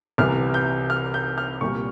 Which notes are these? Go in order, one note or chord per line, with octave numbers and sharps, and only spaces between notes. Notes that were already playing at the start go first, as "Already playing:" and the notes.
C2 C3 E3 G3 F6
G6
F6
G6
F6
C2 A#2 G3 C#6